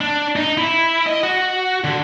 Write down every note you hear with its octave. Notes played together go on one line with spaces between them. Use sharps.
D4
D#4
E4
D#5
F#4
D3